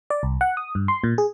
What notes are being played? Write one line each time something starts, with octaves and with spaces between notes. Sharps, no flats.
D5
C2
F#5
D#6
G2
C6
A#2
G#4